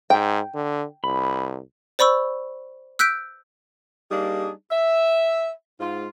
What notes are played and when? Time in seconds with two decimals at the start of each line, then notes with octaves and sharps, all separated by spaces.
0.10 G#2 G5
0.55 D3
1.04 C2 B5
1.99 C5 D5 B5 C#6 E6
2.99 E6 F#6 G6 B6 D7
4.11 G3 A#3 D4 D#4 G#4
4.71 E5
5.80 G#2 F4